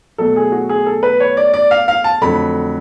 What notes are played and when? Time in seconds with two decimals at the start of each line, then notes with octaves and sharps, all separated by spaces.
0.18 B2 F#3 A3 A4
0.36 G#4
0.52 F#4
0.69 G#4
0.86 A4
1.03 B4
1.20 C#5
1.37 D5
1.54 D5
1.71 F5
1.88 F5
2.04 A5
2.21 F2 D3 F#3 A3 B5